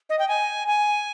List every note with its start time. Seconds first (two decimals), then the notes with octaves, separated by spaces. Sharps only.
0.10 D#5
0.19 G5
0.28 G#5
0.68 G#5